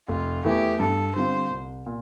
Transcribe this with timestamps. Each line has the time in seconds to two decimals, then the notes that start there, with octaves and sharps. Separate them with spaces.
0.08 F1 F4
0.44 E2 E3 A3 E4 G4
0.79 G2 A4
1.15 D3 G3 C4 F4 C5
1.51 C2
1.86 A#2